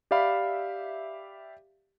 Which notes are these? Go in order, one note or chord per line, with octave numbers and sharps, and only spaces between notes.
G4 D5 E5 F5 B5